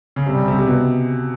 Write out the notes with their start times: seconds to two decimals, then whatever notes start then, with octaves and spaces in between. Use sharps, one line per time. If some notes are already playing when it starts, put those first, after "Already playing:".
0.16 C#3
0.26 C3 G3
0.36 C#3
0.48 C3
0.58 C3
0.66 B2